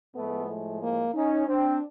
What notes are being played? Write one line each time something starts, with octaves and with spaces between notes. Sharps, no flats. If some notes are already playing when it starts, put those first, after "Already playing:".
A2 F3 G#3 A3 B3
A3
A#3
C#4 D#4
C4 D4